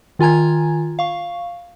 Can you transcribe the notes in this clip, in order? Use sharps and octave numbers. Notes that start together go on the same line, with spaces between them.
D#3 F4 G#5 A#5 G#6
F5 C#6